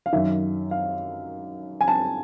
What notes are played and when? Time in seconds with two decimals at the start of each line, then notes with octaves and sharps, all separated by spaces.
0.06 F5
0.13 F#2 D#3 E5
0.71 F5
1.81 G#5
1.88 A5